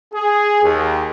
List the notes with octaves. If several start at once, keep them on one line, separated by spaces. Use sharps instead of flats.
G#4
D#2